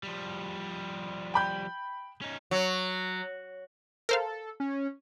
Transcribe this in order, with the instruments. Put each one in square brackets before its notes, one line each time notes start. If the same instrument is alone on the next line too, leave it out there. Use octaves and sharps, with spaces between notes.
[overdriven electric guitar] F3 G3
[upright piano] G5 B5 G6
[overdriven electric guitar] C#4 D#4
[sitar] F#3
[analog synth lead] A4 [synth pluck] A#4 C5 F5
[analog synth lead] C#4